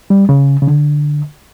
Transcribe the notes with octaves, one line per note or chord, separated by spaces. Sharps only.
G3
C#3
C#3
D3